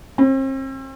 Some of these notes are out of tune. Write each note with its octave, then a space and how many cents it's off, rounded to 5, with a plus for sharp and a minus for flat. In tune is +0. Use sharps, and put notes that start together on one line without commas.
C4 +40